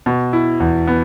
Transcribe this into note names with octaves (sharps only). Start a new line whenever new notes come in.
B2
E4
E2
B3